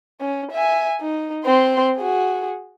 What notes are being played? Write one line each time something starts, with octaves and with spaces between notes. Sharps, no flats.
C#4
E5 G#5
D#4
C4 C6
F#4 G#4